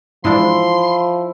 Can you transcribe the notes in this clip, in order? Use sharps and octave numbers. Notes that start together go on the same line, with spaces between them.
G#2 E3 F3 D4 E4 C6